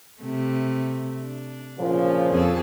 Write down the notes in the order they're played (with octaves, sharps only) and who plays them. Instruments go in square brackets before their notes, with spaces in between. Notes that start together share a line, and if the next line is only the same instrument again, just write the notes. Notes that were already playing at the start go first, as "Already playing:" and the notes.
[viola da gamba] C3 A3
D4
[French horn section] A#2 C#3 F3
[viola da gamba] F2 G#4 A4